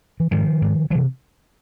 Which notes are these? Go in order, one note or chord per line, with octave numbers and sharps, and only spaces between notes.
E3
G#2 D#3 F3
G#2
C3 E3 F#3